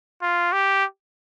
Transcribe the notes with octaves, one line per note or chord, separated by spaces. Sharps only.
F4
G4